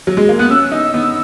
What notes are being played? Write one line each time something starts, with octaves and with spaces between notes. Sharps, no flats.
F#3
G#3
A#3
B3 F#6
C#4 E6
D#4
B3